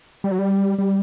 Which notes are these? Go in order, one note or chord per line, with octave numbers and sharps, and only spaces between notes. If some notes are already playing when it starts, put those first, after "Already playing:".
G3
F#3
G3
G3